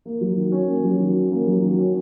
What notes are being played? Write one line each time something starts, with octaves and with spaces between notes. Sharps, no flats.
A#3
F#3
D#3
C#4
A#3
F#3
D#3
C#4
A#3
F#3
D#3
C#4